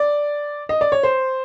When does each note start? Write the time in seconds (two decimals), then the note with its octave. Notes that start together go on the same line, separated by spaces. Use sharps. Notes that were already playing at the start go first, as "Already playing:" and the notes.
Already playing: D5
0.69 D#5
0.81 D5
0.92 C#5
1.03 C5